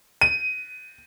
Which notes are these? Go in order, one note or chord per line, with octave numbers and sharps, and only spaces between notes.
D#7